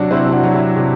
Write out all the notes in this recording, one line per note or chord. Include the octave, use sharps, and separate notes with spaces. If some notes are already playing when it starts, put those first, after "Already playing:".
Already playing: C3 F#3 D4 F#4
C3 C4 E4
D4 F#4
F#3
E4 G4
C3